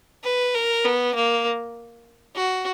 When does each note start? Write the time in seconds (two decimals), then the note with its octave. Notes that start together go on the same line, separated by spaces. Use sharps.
0.24 B4
0.54 A#4
0.85 B3
1.15 A#3
2.35 F#4